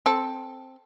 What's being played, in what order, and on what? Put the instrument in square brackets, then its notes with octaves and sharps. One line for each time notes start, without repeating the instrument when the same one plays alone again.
[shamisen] C4 A4